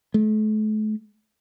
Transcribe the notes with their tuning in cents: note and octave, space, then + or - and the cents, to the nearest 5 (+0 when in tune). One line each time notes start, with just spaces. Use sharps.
A3 -40